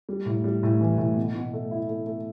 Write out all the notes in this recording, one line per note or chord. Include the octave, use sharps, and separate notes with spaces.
G3
A2
G3
A2
E3
A2
B2
B2
A3
E4
A3
A3